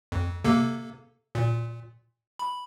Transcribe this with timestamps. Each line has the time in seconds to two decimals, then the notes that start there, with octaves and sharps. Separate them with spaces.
0.12 F2
0.44 C3 A#3 A4
1.35 A#2
2.39 B5